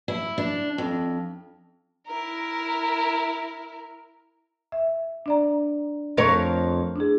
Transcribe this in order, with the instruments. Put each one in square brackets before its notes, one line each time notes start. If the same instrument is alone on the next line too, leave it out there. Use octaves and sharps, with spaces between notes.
[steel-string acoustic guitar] E4
D4
F2
[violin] E4 A#4
[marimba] E5
D4 D5 A#5
[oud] F2 A#4 C#5 [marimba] A3
[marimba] D4 E4 G#4